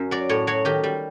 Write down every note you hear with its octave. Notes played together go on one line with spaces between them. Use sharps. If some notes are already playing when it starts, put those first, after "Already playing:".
Already playing: F#2
F#3 D5
A2 C#5
F#3 C#5
D#3 G4
G3